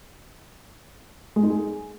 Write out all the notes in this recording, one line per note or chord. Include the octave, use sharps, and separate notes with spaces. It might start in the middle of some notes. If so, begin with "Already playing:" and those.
G#3
D#4
G#4